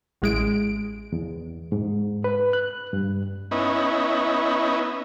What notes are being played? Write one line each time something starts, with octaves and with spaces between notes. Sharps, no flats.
A1 G#3 D7
E2
G#2
B4
F#6
G2
B3 C#4 D#4 E4